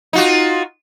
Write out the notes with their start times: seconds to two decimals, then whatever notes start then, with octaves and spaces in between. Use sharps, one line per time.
0.13 D#4 F4 F#4